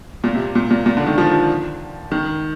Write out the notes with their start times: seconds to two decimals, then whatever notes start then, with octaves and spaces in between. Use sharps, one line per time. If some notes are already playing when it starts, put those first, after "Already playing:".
0.24 A#2
0.35 C3
0.55 A#2
0.71 A#2
0.86 A#2
0.97 D3
1.07 D#3
1.18 F3
2.12 D#3